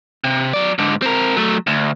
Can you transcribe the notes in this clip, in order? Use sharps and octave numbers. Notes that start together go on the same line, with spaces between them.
C3
F#3 D5
G#2 D3
C4 A#4
F#3 A3
D2